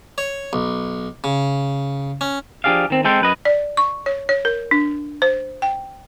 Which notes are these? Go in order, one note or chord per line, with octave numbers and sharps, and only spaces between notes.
C#5
B1
C#3
C#4
F3 D4 G4 G#4 D5 F5
D#3 C4
G#3 C4 A4 C5 G5
F#2 B4 D#5
D5
C#6
C#5
C#5
A#4
D4
C5
G5